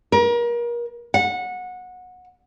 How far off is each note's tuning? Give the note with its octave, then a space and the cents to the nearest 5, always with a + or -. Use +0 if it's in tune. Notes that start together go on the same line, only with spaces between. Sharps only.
A#4 +35
F#5 -20